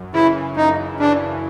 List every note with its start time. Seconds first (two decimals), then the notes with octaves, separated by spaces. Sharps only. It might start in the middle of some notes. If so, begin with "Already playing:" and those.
Already playing: F#2
0.14 C#3 E3 E4
0.56 F#2 D#4
1.00 C#3 E3 D4